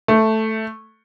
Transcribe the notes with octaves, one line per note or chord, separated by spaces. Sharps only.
A3